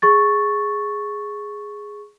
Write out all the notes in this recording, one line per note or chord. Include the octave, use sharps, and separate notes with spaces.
G#4 C#6 A6